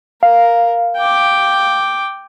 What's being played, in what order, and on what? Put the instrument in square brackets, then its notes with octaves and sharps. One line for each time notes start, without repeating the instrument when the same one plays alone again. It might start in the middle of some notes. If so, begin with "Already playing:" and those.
[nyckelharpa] A#4 [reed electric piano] F5
[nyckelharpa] G5 D6